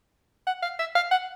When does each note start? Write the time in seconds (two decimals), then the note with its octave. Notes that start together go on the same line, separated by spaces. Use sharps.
0.47 F#5
0.63 F5
0.79 E5
0.96 F5
1.11 F#5